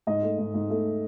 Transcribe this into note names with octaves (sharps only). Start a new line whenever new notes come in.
G#2 D#5
A3
G#2
G#2
A3